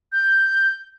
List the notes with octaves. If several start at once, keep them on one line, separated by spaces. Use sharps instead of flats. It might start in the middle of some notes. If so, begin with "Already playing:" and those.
G6